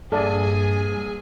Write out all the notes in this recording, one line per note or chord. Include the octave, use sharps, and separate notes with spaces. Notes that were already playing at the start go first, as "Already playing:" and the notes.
A#1 G2 G#4 A4 D5 G#5 A5